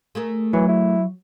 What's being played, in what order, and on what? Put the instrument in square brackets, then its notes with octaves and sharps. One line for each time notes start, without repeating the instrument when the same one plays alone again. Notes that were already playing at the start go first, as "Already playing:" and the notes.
[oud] A3 G#4 A#4
[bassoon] E3 [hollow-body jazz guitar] F#3
[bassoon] E4